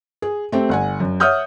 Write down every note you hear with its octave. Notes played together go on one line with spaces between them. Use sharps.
G#4
A3 C4 G4
G1 F#5 G#5
F#2
C#5 E5 F#5 D#6 F6 G6